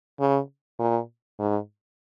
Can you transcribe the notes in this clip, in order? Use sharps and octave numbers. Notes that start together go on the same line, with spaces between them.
C#3
A#2
G#2